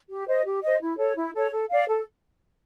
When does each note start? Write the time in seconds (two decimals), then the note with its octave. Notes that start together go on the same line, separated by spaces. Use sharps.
0.09 G4
0.27 C5 D#5
0.45 G4
0.62 C5 D#5
0.81 E4
0.98 A4 C#5
1.16 E4
1.34 A4 C#5
1.51 A4
1.69 D5 F5
1.88 A4